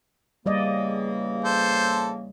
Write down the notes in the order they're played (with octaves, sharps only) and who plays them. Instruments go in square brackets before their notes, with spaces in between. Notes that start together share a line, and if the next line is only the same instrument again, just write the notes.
[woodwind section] E2 C#3 A#3 [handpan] G3 D5 D#5
[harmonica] A4 C5